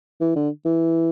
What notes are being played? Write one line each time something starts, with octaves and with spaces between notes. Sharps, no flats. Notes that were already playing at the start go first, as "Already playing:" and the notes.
E3
D3
E3